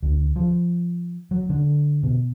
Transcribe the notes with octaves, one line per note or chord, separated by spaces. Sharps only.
D2
F3
F#3
D3
B2